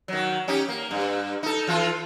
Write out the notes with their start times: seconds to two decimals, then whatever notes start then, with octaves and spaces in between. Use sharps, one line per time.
0.08 D#3 F#3
0.48 C#4 D#4 G4
0.68 A#3
0.91 G2
1.43 D#4 A4
1.67 E3 F4 A4